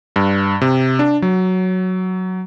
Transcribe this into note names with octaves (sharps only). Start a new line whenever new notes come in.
G2
C3
D4
F#3